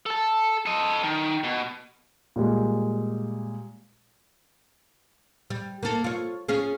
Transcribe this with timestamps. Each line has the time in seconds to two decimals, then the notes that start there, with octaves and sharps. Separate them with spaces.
0.06 A4 A5
0.66 A4 D#5
1.04 D#3
1.44 B2
2.36 A#2 G3 G#3
5.50 G3
5.83 A#3 A4
6.04 F4 C#5
6.48 C#4 F4 G#4